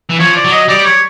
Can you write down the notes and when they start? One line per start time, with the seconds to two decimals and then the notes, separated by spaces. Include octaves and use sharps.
0.10 E3
0.20 F3 C#5
0.36 D5
0.45 F#3
0.52 D#5
0.68 G3 D5
0.85 C#5